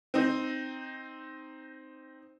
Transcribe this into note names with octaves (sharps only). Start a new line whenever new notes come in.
C4 D#4